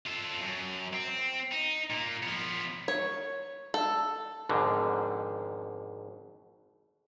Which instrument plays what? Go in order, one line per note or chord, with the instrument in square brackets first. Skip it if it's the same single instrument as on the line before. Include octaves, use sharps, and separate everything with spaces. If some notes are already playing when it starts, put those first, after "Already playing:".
[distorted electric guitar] F4 A4
F#2
C4
D#4
A#2 A#3
F3 B3
[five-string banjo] C#5
A4
[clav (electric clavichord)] G#1 F2 G#2 B2 D3